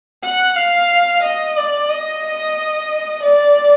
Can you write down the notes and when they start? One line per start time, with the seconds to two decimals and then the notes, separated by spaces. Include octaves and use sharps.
0.24 F#5
0.56 F5
1.23 D#5
1.57 D5
1.90 D#5
3.23 D5